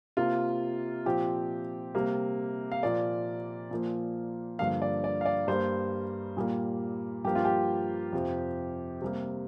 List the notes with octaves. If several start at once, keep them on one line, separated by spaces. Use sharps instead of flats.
C3 A#3 F4
A#2 F3 C4 G4
C3 G3 A#3
F5
A#2 F3 A#3 D5
A#2 F3 A#3
G2 D3 F3 A#3 F5
D5
D5
F5
D5
G2 G3 A#3 C5
A#2 G3 A#3
G2 F3 A#3 G4
F4
G4
F2 C3 F3
C3 G3 A#3